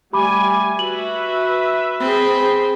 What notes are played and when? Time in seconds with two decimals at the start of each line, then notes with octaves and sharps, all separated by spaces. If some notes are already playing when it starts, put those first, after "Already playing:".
0.13 G3 A3 G4 G#5 B5 D6
0.79 F#4 B4 E5 F#7
2.01 C4 G#4 B5